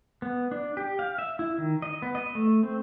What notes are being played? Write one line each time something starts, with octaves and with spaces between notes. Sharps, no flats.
B3
D4
G4
F5
E5
E4
D#3
D#5
B3
D#5
A3
C4